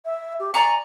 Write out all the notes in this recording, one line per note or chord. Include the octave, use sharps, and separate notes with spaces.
E5
G4
D5 G#5 A#5 C#6